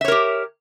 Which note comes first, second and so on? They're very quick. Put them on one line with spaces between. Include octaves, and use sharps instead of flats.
E5 C#5 A#4 G4